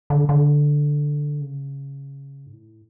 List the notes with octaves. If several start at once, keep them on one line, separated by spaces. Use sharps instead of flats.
D3
D3
C#3
G#2
A2